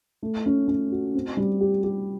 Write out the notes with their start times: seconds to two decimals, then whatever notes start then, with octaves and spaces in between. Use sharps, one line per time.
0.23 A3
0.46 C#4
0.68 C#4
0.92 F#4
1.15 C4
1.37 G3
1.61 G4
1.84 G4